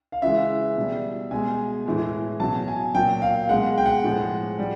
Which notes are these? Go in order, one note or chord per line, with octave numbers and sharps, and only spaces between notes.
F5
C#3 E3 G#3 E5
B2 G3
B2 G#3 G#5
A2 E3 G#3
B2 F#3 A5
G#5
A#2 F#3 G5
F5
B2 G#3 F#5
G5
F#5
A2 F3 G#3
G3